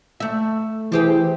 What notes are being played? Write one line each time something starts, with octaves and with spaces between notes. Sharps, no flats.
A3 E5
E3 C4 G4 G#4